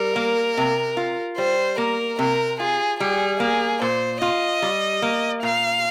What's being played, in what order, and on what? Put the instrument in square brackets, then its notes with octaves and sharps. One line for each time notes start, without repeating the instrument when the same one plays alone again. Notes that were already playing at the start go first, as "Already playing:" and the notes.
Already playing: [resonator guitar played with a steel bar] G3 [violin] A#4
[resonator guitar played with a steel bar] A#3
C3
F4
[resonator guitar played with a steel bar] G3 [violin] C5
[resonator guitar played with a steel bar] A#3 [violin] A#4
[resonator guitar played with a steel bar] C3 [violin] A#4
[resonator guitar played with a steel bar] F4 [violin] G#4
[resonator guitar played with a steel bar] G3 [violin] G#4
[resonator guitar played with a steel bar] A#3 [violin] G#4
[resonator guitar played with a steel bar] A#2 [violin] C5
[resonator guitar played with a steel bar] F4 [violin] D#5
[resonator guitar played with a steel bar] G3
A#3
[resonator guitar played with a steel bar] A#2 [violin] F5